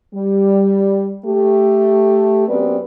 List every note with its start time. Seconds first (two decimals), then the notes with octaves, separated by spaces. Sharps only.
0.15 G3
1.26 A3 G4
2.48 F#2 B3 C4 G4 B4 D5